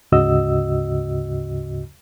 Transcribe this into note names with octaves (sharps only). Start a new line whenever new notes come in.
D2 G#2 C#3 F#4 D#5 E6